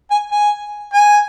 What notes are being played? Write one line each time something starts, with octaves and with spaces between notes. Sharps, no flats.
G#5
G#5
G#5